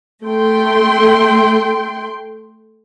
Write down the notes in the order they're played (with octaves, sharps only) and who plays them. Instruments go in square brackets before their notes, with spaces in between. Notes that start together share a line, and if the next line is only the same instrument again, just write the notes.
[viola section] A3 G5 C6